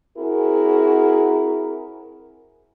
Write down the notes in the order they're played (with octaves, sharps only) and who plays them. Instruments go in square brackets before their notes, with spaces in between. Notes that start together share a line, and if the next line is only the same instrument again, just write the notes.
[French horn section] C4 E4 F#4 G#4 A#4